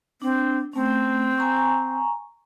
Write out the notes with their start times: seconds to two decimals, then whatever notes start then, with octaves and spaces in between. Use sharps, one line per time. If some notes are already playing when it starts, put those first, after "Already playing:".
0.22 C4 D4
0.73 A3 C4 C#4
1.38 G#5 A#5 C#6